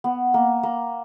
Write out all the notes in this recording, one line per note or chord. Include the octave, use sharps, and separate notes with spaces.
B3
A#3
A#3